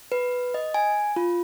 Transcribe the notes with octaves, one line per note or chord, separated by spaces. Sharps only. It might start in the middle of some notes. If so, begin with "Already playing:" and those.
B4
D#5
G#5
F4